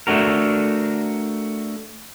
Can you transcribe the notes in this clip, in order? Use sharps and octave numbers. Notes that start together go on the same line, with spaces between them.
A3 D4 F#4 A#4